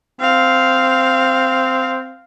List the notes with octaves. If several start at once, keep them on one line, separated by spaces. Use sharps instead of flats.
C4 F5